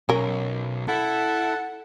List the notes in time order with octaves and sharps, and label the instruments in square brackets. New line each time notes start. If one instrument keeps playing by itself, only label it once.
[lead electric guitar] B1 [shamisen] C#4 A#4
[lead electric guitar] E4 [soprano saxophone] A4 [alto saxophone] F#5